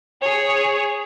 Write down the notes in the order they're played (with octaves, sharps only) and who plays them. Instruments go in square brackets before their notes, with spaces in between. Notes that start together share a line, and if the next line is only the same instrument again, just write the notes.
[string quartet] G#4 C#5